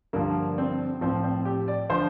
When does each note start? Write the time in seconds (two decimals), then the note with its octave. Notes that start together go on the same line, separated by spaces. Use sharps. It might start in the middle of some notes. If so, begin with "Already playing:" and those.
0.13 G2 D3 F3 A#3
0.58 C4
1.01 A2 F3 C4
1.24 C4
1.45 G4
1.68 D5
1.90 D3 F3 C5